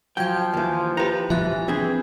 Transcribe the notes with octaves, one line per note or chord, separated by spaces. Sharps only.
F3 F#3 G5 G6 G#6
D#2 E3
E4 G4 B4 G5 A#5
D2 G2 B2 E3 F3 E5 F#6
C4 D4 G#4